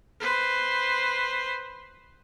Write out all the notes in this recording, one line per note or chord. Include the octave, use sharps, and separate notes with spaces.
B4 C5